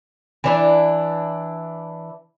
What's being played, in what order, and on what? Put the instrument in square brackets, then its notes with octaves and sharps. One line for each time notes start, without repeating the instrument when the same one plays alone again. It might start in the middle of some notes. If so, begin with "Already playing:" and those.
[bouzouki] E3 D4 E4